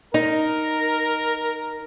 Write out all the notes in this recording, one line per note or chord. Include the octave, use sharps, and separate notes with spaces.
D#4 A#4